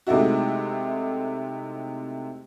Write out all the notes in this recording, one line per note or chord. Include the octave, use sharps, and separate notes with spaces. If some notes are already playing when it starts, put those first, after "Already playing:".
C3 G#3 A3 D#4 E4 F#4